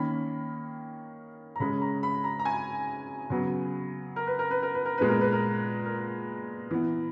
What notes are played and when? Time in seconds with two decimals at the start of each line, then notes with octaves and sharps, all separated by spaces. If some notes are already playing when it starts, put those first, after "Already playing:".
Already playing: D#3 A#3 C#4 B5
1.56 A#5
1.60 C#3 G#3 C#4 B5
1.82 A#5
2.03 B5
2.24 A#5
2.39 A#5
2.45 G#5
3.30 C#3 F#3 B3
4.16 A#4
4.27 B4
4.39 A#4
4.51 B4
4.63 A#4
4.75 B4
4.85 A#4
4.98 A#2 G#3 B3 B4
5.08 A#4
5.21 B4
5.32 A#4
5.86 A#4
6.71 E3 B3